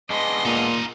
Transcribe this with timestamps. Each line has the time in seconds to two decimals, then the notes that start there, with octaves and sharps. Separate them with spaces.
0.10 G#3 B3 D4 D#5 C6
0.46 A#2 D#4 F4